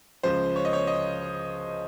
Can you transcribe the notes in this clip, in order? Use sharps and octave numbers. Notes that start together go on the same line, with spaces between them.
C#2 C#3 F3 C5
C#5
D#5
C#5
D#5